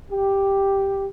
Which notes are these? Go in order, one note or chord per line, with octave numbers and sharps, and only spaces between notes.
G4